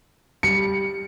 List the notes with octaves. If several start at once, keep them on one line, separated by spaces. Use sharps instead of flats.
G3 C#7